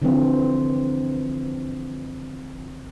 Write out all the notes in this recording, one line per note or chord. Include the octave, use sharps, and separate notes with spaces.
D3 E3 F3 C4